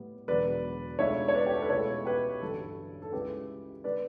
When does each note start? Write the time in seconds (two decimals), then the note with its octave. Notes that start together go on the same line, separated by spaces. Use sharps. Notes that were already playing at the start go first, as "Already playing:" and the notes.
Already playing: A2 G3 B3
0.28 E1 E2 D3 F#3 B4 D5
0.99 C#2 B2 A3 D4 C#5 E5
1.28 C#5
1.34 B4 D5
1.47 G4
1.55 A4
1.62 B4
1.70 C#2 B2 A3 E4 A4 C#5
2.05 G4 B4
2.41 A1 G2 D3 F#3 A4
3.02 A4
3.13 C#2 C#3 G3 C#4 E4 G4 B4
3.84 D3 G3 B3 D4 B4 D5